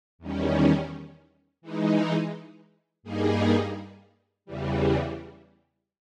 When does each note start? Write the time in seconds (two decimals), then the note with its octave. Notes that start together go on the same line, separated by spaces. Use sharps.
0.19 E2 D#3 G3 C#4
1.62 E3 G#3 D#4
3.03 G2 G3 A#3 D#4 G#4
4.45 E2 C#3 E3 G3